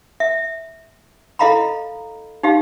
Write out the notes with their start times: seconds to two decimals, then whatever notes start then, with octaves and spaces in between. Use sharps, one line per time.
0.20 E5
1.39 E4 A4 D#5 F5 A#5 B5
2.43 D#4 G4 F5